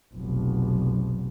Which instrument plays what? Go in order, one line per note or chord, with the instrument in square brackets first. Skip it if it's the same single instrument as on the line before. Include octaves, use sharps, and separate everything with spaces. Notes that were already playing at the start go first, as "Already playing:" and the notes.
[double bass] F1 B1